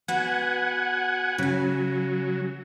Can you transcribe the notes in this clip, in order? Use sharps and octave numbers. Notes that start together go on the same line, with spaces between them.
B3 F#4 F#5 G#5
C#3 F#3 G#5